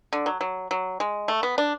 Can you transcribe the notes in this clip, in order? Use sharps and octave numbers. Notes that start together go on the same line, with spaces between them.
D3
F#3
F#3
F#3
G#3
A3
B3
D4